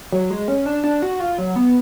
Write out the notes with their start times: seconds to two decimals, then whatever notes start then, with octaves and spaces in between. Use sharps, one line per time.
0.12 F#3
0.30 G#3
0.48 C#4
0.66 D4
0.84 D4
1.02 F#4
1.20 F4
1.38 F#3
1.56 B3